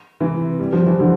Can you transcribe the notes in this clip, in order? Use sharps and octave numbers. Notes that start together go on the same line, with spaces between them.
C3 E3
G3
F3
E3
D3 F3